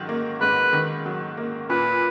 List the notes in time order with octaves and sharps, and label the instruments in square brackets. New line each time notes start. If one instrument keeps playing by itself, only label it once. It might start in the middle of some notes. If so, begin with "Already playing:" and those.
Already playing: [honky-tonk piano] G#2 D#3 F#3
A#3
[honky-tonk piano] G#2 [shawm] B4
[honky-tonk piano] D#3
F#3
A#3
[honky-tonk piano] A#2 [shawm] B4